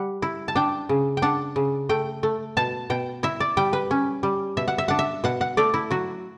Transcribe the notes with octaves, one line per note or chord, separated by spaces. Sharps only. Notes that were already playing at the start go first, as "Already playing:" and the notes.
Already playing: G3 F#5
E4
A5
D4 G5
C#3
G5
D4 F#5
C#3
A3 G5
A3
B2 A5
B2 G5
E4 E5
D5
G3 G5
B4
C#4
G3
B2 E5
F#5
E5
D4 F#5
E5
B2 F#5
F#5
A3 D5
E4
F#3 F#4